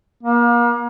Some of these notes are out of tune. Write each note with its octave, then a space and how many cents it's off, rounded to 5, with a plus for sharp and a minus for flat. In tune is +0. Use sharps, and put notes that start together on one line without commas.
A#3 +35